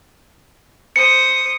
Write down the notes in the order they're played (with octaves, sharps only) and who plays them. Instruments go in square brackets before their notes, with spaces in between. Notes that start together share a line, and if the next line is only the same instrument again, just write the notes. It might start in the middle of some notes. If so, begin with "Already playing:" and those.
[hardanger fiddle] C5 D#6 [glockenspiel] C#7